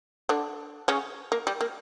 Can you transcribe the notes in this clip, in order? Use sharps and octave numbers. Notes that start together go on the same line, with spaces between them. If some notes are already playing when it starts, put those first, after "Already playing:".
D3 D4
C#3 C#4
A#3
G3
A#3